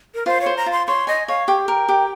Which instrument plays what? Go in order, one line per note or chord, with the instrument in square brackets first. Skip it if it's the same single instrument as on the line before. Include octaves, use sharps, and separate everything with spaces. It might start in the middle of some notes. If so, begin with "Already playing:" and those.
[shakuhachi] A#4
[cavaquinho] F4 [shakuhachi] C5
[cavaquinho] C5 [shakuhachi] C#5
[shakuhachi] A#5
[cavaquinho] F4
[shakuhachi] C6
[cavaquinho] C#5 [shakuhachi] C6
[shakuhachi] D#5 [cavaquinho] G#5
[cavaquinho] C#5 [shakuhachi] F5
[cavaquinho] G4 [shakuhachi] G5
[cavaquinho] A#4
G4